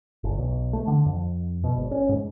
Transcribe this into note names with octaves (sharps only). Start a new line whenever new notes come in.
G1
B1
A3
D3
F2
B2
G#1
C#4
G#2